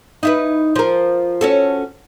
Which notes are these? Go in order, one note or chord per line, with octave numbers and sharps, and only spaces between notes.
D#4 E4 B4
F3 A#4
C#4 F#4 A4